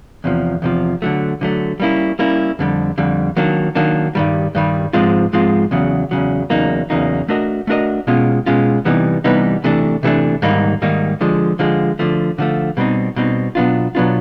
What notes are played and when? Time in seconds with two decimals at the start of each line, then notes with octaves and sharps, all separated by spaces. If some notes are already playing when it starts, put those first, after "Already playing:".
0.24 E2 C3 F3
0.62 E2 C3 F3
1.02 D3 F#3 A3
1.41 D3 F#3 A3
1.80 G3 A#3 C#4 E4
2.19 G3 A#3 C#4 E4
2.59 F2 D3 G3
2.98 F2 D3 G3
3.37 D#3 F#3 A#3 D4
3.75 D#3 F#3 A#3 D4
4.15 G2 D#3 G3
4.55 G2 D#3 G3
4.93 G#2 F3 G#3 C4 F4
5.33 G#2 F3 G#3 C4 F4
5.71 E2 C#3 F#3
6.11 E2 C#3 F#3
6.50 E2 C#3 F#3 A#3 D#4
6.90 E2 C#3 F#3 A#3 D#4
7.28 A3 D4 F#4 A#4 D#5
7.67 A3 D4 F#4 A#4 D#5
8.07 B2 G#3 C#4 F4
8.46 B2 G#3 C#4 F4
8.85 C3 E3 G3 B3 D#4
9.24 C3 E3 G3 B3 D#4
9.64 C3 E3 A3 D4
10.03 C3 E3 A3 D4
10.42 G#2 D#3 G3 A#3 D#4
10.82 G#2 D#3 G3 A#3 D#4
11.21 D3 F3 G#3
11.59 D3 F3 G#3
11.99 D3 F3 A3
12.38 D3 F3 A3
12.77 B2 G3 C4 D#4
13.16 B2 G3 C4 D#4
13.55 B2 F#3 B3 D4 F4
13.95 B2 F#3 B3 D4 F4